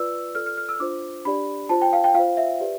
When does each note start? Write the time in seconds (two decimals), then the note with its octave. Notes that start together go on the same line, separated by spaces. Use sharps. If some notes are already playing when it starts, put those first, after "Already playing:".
Already playing: F4 B4 D5 E6
0.35 F4 A4 D5 F6
0.46 F6
0.57 F6
0.69 E6
0.80 D4 F4 C5 D6
1.25 D4 G4 D5 B5
1.69 F4 C5 A5
1.82 G5
1.93 F5
2.04 G5
2.15 F4 C5 F5
2.37 E5
2.60 G4 B4 D5